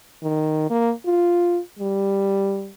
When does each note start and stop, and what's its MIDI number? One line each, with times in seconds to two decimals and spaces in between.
0.23 0.66 51
0.70 0.92 58
1.06 1.60 65
1.79 2.72 55